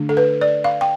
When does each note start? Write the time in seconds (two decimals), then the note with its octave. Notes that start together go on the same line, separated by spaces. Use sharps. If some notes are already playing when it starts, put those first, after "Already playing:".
Already playing: D3 A3 D4
0.09 A4
0.17 B4
0.41 D5
0.64 F5
0.81 G5